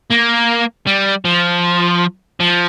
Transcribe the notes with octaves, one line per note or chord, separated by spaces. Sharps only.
A#3
G3
F3
F3